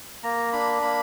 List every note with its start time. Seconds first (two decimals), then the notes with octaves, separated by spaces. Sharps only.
0.23 A#3 A#5
0.53 D4 B5
0.82 A#3 B5